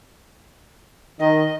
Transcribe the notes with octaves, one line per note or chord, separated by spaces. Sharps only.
D#3 D#5